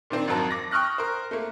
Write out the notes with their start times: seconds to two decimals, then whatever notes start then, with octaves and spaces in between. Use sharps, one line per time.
0.10 A#2 D#3 C4 D4
0.27 G#1 F2 F#3 A#4 A5
0.51 D6 A#6
0.71 G5 C#6 D#6 F6 F#6 A#6
0.98 A#4 C5
1.31 A3 A#3